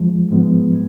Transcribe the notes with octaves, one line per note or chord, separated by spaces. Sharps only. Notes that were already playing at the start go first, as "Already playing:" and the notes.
Already playing: F2 F3 G#3
G#2 F3 G#3 B3